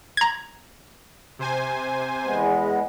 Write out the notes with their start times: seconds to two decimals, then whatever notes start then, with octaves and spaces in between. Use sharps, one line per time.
0.17 A#5 G#6
1.39 C3 C5 G#5
2.26 E2 G#3 B3